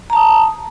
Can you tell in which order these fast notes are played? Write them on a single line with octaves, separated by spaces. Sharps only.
A#5 A5 D#6